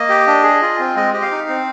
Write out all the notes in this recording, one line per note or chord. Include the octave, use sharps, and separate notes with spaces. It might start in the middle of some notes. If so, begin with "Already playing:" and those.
Already playing: A#3 D#5
G4
D4
G#4
F4
C4
G#3 D#5
G4 D#5
F5
D#4
C4